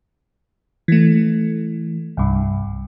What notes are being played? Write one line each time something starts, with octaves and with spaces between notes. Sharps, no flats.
E3 A3
C2 G2